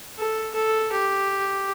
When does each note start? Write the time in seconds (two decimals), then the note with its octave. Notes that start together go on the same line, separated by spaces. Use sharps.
0.18 A4
0.55 A4
0.92 G4